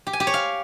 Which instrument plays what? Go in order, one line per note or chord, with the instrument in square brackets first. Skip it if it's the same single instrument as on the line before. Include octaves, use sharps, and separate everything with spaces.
[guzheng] G4
G#5
G4
C#5
F5